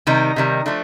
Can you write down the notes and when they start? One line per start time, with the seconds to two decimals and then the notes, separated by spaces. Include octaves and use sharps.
0.07 C3 D#3 G3 D#4
0.36 C3 D#3 G3
0.66 F3 A3 D4